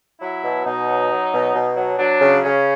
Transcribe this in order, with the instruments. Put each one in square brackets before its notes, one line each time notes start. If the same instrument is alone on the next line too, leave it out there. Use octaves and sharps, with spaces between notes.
[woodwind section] F#3 E4
B2
B2 D#4
F#3
F#3
B2
B2
F#3
F#3 D4
C#3
C#3 C#4